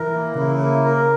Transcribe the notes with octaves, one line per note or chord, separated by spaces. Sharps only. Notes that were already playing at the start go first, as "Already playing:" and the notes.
Already playing: E3 A#4
A#3
C#3 E4
A#3
A#4